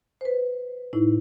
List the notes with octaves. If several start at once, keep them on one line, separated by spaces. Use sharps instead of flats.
B4 C5
A2 D#4 E4